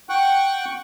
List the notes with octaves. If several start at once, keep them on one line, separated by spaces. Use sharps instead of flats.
F#5 G5 C#6 F#6